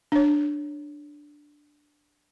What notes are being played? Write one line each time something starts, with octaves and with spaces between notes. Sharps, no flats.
D4 C#5